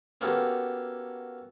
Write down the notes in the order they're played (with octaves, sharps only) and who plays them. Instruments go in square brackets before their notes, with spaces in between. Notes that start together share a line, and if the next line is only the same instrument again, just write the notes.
[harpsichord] A#3 B3 C#4 F#4 G4 A4